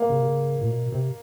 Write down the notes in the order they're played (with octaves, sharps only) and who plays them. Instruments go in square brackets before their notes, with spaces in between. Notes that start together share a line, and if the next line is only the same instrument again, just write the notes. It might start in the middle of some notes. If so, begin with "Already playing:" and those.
Already playing: [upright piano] A#3
[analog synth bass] C#3
C3
C#3
A#2
B2
C3